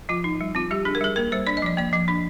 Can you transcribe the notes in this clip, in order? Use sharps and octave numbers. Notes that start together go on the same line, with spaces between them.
F3 F4
D#4
G3
C4 F4
G3 G4
D4 G#4
A#4
G3 G#4
A#3 A#4
G3 C5
D4 D5
D#5
F3 D5
A#3 D5
F3
D4